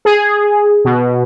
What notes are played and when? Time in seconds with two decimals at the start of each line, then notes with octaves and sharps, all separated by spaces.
0.05 G#4
0.85 B2